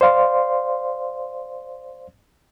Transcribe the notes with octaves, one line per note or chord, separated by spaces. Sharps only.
C5 D5 F5 C6